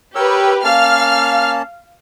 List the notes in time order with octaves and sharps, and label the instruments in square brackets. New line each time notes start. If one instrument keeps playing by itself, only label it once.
[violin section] G4 B4 [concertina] A#4 C#5 E6
[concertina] A#3 C#4 A5 [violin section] F5 F6